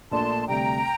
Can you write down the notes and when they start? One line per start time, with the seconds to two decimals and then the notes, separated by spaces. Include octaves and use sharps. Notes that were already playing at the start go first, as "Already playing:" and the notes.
0.11 A#1 A#2 A3 D4 A5 C6
0.48 D2 C3 G3 G5 A#5